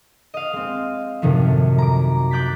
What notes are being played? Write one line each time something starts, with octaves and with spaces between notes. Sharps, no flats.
D#5 F5
G#3 C4
F#2 A2 C3 D#3 F3
A#5 D6
A#5 D6 F#6 G6 A6 B6